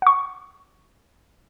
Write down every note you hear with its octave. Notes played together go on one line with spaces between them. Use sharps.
F#5 C#6